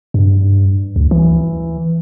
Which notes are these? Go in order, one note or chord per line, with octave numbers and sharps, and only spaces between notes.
G2
D2
E3